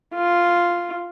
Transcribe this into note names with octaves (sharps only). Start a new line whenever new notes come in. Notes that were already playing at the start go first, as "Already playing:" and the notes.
F4